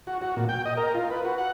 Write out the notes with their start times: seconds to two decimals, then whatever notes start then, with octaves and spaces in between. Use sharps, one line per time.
0.07 F#4
0.22 F#4
0.36 A#2
0.49 G5
0.65 D#5
0.77 A#4
0.95 F4
1.10 B4
1.25 F#4
1.38 F#5